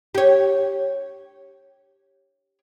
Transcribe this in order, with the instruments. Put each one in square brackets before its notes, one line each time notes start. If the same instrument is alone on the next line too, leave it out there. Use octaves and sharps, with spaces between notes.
[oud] G4 C#5